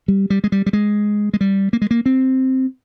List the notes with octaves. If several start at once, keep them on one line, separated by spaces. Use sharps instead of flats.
G3
G3
G#3
G3
G3
G#3
G#3
G3
A#3
G#3
A#3
C4